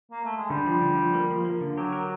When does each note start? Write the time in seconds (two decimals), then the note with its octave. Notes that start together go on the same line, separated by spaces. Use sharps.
0.12 A#3
0.25 A3
0.37 G#3
0.49 D3 G3
0.66 F3
0.81 D3
0.98 F3
1.13 A#3
1.30 F3
1.45 A#3
1.61 D3
1.77 F#3 G4
1.92 A#4